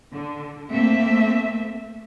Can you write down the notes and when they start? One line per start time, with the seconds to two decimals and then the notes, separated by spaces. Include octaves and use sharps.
0.12 D3
0.72 A3 A#3 C4 E5